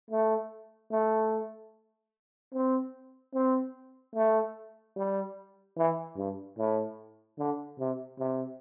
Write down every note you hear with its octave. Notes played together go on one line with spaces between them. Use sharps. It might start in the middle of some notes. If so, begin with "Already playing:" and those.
A3
A3
C4
C4
A3
G3
E3
G2
A2
D3
C3
C3